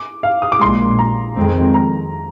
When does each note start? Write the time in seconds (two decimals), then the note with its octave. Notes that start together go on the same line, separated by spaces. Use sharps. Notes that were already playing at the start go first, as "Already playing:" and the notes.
Already playing: D6
0.23 F5
0.42 D#6
0.52 D6
0.61 A#1 A#2 G#3 C6
0.99 A#5
1.37 F2 D#3 G#3 C4
1.74 A#5